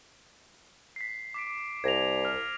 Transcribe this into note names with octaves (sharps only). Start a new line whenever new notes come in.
B6 C7
D6 B6 D7
C2 G#6 A#6 F7
F6